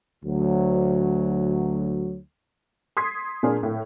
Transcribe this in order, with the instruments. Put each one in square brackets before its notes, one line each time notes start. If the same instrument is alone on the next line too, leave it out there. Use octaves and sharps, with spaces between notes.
[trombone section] D2 F#3
[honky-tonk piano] C6 D#6 G#6 B6 C7
A#2 D4 G#4 A#4
A2